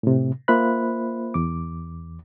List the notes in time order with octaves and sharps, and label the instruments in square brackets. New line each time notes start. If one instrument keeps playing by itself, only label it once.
[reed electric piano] A2 C3
A#3 F4 C5 E5 B5 F#6
E2 D6